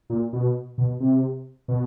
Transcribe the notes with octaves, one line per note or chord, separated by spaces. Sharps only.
A#2
B2
B2
C3
B2